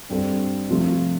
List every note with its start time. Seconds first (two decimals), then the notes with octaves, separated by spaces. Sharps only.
0.09 G2 G3 C4 A4
0.69 C3 F3 A3 F4